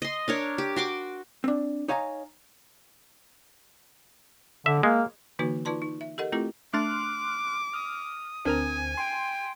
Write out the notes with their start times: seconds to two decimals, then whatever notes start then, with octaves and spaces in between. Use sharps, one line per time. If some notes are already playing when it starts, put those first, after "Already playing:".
0.02 D#5 C6
0.28 D4 A#4 C#5
0.58 G4
0.76 F#4 C6 D6
1.44 C4 D4
1.88 D#4 C#5 F5 G#5 A#5
4.66 D3 E5
4.83 G#3 A#3
5.39 D3 E3 A#3 D#4 F#4 B4
5.65 D#4 F4 B4 D5 A5 C6
5.82 D#4
6.01 E5
6.18 G4 A4 A#4 D#5 F#5
6.32 A3 C4 E4 F4 G4 A4
6.74 A3 D4 C6 D6 F6 F#6 A6
7.73 D#6 F6
8.45 D2 C4 D4 A#4 G#5 A#5
8.97 G5 C6